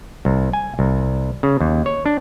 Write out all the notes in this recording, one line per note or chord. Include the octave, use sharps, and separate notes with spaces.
C2
G#5
C2
C#3
D#2
C#5
D4